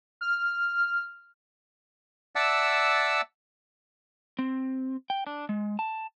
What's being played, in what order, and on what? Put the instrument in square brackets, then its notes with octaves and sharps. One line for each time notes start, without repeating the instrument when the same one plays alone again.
[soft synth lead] F6
[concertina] D5 E5 F#5 A5 E6
[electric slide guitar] C4
G5
D4
G#3
A5